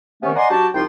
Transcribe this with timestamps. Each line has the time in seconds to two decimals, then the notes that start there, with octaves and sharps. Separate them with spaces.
0.23 C3 D#3 A3 B3 C#4
0.36 D5 D#5 F#5 G#5 A#5 C6
0.50 F#3 D4 F#4 G4 A5
0.74 C2 F3 D#4 F4 G5 C6